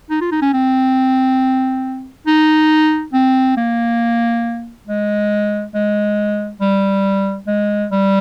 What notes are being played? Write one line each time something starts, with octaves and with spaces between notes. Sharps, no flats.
D#4
F4
D#4
C#4
C4
D#4
C4
A#3
G#3
G#3
G3
G#3
G3